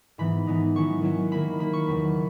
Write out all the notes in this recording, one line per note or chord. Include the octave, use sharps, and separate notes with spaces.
G#2 E3 B3 D#4 B5
G#2 E3 B3 D#4
D#3 F#3 C#4 E4 C#6
D#3 F#3 C#4 E4
D#3 A#3 E4 B5
D#3 A#3 E4 B5
C#6
E2 C#3 F#3 B5